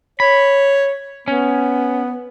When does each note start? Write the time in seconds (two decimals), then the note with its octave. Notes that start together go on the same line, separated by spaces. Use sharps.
0.20 C#5 B5
1.28 B3 C#4